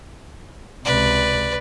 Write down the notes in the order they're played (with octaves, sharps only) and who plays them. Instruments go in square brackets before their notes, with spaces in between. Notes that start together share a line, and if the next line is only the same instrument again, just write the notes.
[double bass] C#2 C3 [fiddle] B4 D5